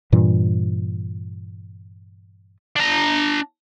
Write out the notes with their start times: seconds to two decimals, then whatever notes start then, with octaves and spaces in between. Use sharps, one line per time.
0.12 G2 A#2 E3 G3
2.76 D4 A#5